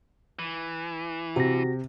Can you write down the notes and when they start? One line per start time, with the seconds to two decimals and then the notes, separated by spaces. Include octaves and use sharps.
0.39 E3
1.36 C3 F#4 A#6